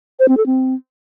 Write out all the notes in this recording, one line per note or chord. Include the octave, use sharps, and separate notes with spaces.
C5
C4
A4
C4